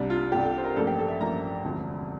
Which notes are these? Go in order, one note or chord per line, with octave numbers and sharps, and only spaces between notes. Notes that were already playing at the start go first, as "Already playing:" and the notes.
Already playing: C2 C3 G3 D4
F4
C2 C3 G3 D4 G4
A4
C5
A#4
A1 G2 F3 A#3 A4
G4
A4
E5
A1 G2 F3 A#3 A#5
E1 D2 C3 F3